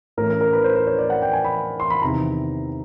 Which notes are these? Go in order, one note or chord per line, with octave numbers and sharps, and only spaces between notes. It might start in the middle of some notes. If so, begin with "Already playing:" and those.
A2 E3 A3 C#4 A#4
A#4
A#4
B4
C5
C5
C#5
D5
F#5
G5
G#5
B5
C6
B5
E2 C3 D#3 A#5